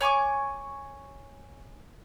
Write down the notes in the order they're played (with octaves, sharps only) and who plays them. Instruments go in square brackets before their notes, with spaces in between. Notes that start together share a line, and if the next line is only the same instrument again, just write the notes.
[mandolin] C#5 G#5 C#6 D6